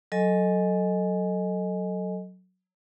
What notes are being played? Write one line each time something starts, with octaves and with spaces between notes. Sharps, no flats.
F#3 A4 D#5 G#5